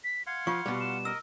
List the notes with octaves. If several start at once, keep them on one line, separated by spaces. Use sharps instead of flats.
B6
F5 F#5 C6 G#6
F3 F4 C#6
B2 G3
E7
A#4 D#5 E6